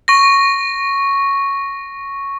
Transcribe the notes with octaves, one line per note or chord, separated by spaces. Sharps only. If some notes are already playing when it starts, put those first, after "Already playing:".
C#6 A#6